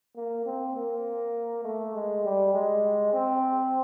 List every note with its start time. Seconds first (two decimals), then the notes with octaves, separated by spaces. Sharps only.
0.16 A#3
0.46 C4
0.76 A#3
1.64 A3
1.94 G#3
2.24 G3
2.54 G#3
3.13 C4